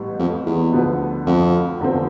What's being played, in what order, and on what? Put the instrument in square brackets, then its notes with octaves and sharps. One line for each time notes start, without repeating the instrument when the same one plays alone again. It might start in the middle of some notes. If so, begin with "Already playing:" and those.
Already playing: [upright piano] A1 A2 G3 B3
[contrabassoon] F2
E2
[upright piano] D2 D3 F3 B3
[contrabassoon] F2
[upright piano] F1 E2 D3 F3 C4